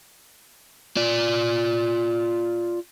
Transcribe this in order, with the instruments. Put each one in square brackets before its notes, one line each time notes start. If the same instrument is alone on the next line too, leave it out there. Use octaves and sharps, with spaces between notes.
[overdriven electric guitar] F4 D5